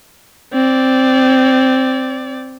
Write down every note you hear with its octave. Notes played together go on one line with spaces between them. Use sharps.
C4 D5